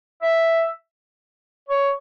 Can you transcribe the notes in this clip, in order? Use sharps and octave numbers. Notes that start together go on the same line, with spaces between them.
E5
C#5